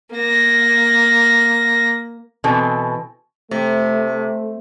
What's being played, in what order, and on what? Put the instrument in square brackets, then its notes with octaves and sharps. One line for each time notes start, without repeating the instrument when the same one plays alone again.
[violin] A#3 A#6
[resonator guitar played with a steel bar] B2 E3 C4 A4
[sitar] C3 [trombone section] A3